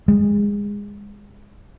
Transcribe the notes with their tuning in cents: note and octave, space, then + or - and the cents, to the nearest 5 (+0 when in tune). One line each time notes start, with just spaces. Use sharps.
G#3 -20